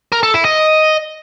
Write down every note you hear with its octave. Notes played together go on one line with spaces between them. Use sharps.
A#4
A4
E4
D#5